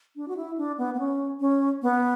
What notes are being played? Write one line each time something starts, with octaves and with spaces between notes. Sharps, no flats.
D4
F#4
E4
D4
B3
B3
C#4
C#4
B3